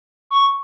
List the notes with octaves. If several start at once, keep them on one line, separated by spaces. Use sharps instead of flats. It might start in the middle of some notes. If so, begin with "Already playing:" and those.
C#6